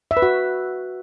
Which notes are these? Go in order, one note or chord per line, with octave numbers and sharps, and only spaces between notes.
E5
B4
F#4